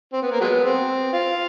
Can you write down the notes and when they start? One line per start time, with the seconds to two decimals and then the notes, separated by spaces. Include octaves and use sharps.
0.13 C4
0.22 B3
0.31 A#3
0.41 F#3 G#3 B3
0.64 C4
1.13 F4